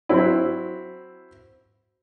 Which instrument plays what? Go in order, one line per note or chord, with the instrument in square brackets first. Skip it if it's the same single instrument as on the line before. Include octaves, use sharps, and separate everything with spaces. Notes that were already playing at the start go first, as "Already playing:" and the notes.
[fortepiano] F#3 C4 E4